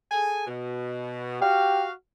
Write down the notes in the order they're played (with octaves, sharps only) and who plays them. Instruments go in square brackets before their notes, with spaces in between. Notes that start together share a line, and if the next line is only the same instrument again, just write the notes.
[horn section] G#4 A4 G#5
B2
[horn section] F#4 F5 [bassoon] G4